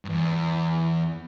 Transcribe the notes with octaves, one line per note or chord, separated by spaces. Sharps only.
E2 G2